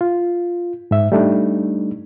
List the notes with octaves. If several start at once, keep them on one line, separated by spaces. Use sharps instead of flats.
F4
G#2 E5
G3 A3 D4 D#4